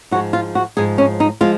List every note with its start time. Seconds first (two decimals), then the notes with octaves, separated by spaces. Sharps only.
0.11 G#2 F3 G#3 F#4
0.33 F4
0.55 F#4
0.77 G#2 F3 G#3 G#4
0.98 C#4
1.20 D#4
1.41 F3 G#3 F4